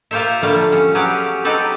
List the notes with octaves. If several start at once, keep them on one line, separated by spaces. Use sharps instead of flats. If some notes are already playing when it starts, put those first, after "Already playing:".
A#3 F4 G4 C5 C#5 E5
D3 F3 G3 A3 A#3
C#4
F#3 B3 C#4 G4 G#4
C4 D#4 G4 A4 B4